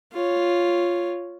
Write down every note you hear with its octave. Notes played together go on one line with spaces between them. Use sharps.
F4 C#5